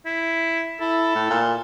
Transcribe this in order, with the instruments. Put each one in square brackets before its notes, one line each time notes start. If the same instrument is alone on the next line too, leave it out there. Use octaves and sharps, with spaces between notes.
[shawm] E4
[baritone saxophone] E4 [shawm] A4
[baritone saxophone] A2
A#2